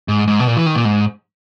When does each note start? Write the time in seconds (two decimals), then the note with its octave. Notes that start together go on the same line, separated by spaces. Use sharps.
0.08 G#2
0.27 G#2
0.40 B2
0.47 A#2
0.57 E3
0.66 D#3
0.76 A#2
0.85 G#2